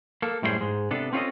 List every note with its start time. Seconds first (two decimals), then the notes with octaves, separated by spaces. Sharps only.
0.22 A#3 A4
0.42 F#2 A2 G3 E4 G#4 C5
0.61 G#2 G#3
0.91 C3 B3 D4 A4
1.13 C4 C#4 F4 G4 A4 D#5